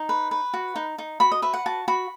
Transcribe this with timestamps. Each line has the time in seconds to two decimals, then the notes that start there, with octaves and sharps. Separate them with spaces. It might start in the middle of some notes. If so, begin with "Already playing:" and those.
Already playing: D#4
0.09 B4
0.31 B4
0.54 F#4
0.76 D#4
0.98 D#4
1.20 F#4 B5
1.32 D#5
1.42 B4 E5
1.53 F#5
1.66 F#4 A5
1.88 F#4 B5